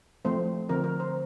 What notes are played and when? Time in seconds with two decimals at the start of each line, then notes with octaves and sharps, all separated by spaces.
0.25 F3 A3 C4 C5
0.69 D3 F3 C4 A#4
0.84 A#4
1.00 C5